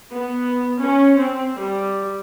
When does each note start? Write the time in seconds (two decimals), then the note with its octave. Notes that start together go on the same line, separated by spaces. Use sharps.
0.11 B3
0.81 C#4
1.20 C4
1.60 G3